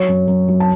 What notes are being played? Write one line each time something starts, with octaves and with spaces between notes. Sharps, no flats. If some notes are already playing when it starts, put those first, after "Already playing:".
Already playing: F#3 C#5
F#2
F#2
F#3
A5